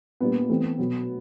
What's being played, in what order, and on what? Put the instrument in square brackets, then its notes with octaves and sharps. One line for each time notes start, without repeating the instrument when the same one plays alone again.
[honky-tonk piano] A#2 G3 A#3 D4 [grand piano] B3
[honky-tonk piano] E3 A3 C4
B2 F#3 B3